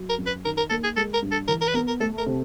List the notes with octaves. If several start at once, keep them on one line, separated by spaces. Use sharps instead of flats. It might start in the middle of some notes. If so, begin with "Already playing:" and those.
Already playing: F#3
A#4
F#2
B4
D#3 A#4
A#4
A#3 A4
G#4
G#3 A4
A#4
G2
A4
E3 A#4
A#4
B4
B3 A#4
A#4
A3 A4
A#4
C3